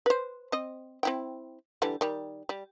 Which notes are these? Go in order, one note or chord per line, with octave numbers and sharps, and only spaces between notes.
B4 C5
C4 D#5
C4 E4 G5
D3 E3 G3
D#3 G3
G3